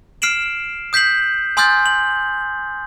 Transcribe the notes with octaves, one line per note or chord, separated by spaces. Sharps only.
F6 C7 D7 E7 F#7
D#6 G6 B6 C7 F#7
G#5 C6 D#6 F6 G6 A6
F#7